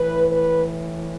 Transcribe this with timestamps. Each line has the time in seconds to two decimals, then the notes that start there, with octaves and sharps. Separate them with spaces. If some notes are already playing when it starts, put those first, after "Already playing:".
Already playing: A2 E3 B4
0.30 B4